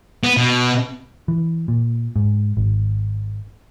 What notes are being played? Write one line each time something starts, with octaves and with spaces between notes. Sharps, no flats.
B3
B2
E3
A#2
G#2
G#1